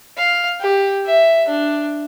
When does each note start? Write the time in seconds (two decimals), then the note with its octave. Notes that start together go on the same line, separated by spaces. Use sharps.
0.17 F5
0.60 G4
1.06 E5
1.48 D4